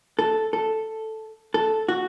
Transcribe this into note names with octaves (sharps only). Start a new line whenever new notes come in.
A4
A4
A4
F#4